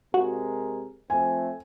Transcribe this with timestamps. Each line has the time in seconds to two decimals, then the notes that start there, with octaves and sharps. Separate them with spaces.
0.14 C3 G#3 F#4 A#4
1.10 F3 A3 C4 G#5